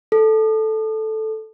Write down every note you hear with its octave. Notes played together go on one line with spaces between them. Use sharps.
A4